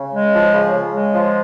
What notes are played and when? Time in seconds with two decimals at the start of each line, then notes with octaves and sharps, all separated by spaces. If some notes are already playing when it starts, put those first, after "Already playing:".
Already playing: C#3
0.14 G#3
0.34 F3
0.53 C#3
0.74 C#3
0.93 G#3
1.14 F3